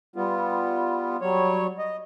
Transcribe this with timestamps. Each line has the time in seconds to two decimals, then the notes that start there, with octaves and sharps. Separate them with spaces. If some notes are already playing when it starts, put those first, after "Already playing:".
0.16 G3 B3 F4
1.21 F#3 G3 C#5
1.79 D#5